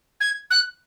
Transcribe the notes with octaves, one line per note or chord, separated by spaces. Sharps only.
G#6
F#6